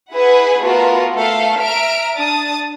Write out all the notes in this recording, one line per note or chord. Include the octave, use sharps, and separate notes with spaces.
E4 G#4 B4 F#5
A3 B3 F4 F#4 A#4
A3 A4 F5
E5 A#5 F6 D7
D4 A5 D#6 A6